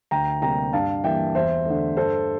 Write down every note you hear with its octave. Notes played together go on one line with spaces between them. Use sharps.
D2 G5 A#5
C3 G3 A#3 G5 A#5
G2 F5 A5
E3 G3 A#3 E5 G5
E2 C5 E5
D3 A3
G2 A4 C5